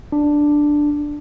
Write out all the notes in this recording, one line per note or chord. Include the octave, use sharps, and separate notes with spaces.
D4